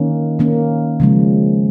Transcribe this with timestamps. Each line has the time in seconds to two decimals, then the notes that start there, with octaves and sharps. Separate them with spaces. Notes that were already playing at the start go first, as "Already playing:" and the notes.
Already playing: D#3 A#3 C#4
0.39 D#3 A#3 C#4
1.00 C#3 F3 G#3